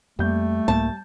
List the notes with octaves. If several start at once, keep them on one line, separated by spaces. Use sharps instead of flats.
F2 G3 A3 A#3 G6
C2 G#2 A#3 A5